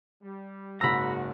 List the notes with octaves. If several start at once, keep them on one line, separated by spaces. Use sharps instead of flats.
G3
F#1 G#2 F#4 A#5 B5 E6